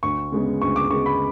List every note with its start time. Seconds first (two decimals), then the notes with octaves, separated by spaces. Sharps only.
0.03 D2 C#6
0.32 C#3 G#3 B3
0.62 D2 C#6
0.76 D6
0.90 C#3 G#3 B3 C#6
1.06 B5